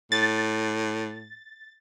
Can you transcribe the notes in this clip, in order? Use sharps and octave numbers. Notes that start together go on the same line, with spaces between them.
A2 A6